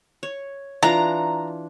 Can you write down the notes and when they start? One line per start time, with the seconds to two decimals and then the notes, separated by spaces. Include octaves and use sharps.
0.23 C#5
0.83 E3 D4 F4 A#5